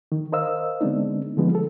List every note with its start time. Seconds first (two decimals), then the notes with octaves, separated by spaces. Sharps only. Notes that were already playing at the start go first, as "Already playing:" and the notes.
0.12 D#3
0.32 A#4 C5 D#5 F5 E6
0.81 D3 G#3 B3 C4 D4 D#4
1.37 D3 F3 G#3 B3 D#4
1.55 A4